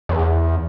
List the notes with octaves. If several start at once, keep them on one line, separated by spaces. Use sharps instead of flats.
E2